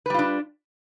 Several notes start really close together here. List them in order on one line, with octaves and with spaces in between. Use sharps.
B4 G3 F4 D4